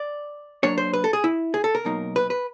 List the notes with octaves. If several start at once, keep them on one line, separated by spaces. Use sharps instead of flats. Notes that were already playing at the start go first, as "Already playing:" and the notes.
Already playing: D5
F#3 A#3 D4 C#5
C5
B4
A4
G#4
E4
G#4
A4
A#4
B2 F#3 A#3 D#4
B4
B4